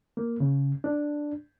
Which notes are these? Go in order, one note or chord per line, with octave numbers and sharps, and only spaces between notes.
A#3
C#3
D4